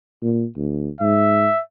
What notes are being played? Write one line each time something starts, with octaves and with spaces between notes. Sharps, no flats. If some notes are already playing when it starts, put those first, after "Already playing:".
A#2
D2
G#2 E5